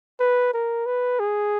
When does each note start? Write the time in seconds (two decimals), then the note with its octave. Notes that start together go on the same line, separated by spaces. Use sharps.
0.20 B4
0.53 A#4
0.86 B4
1.20 G#4